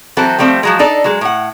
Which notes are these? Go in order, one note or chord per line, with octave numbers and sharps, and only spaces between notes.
E3 F#3 C4 F#4 A4
F3 G3 A3 C4
F3 F#3 G#3
D4 D#4 A4 D5
F#3 G#3
A2 F#5